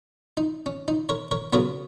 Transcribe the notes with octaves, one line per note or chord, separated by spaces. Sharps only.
D#4
C#4
D#4
A#4 C#5
A#4 C#5
C#3 F#3 B3 A#4 C#5